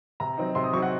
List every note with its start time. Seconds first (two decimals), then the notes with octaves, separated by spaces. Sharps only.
0.20 C3 A#5
0.38 F#3 C4 D#4
0.55 C3 C6
0.64 D#6
0.73 F#3 C4 D#4 C#6
0.82 F#5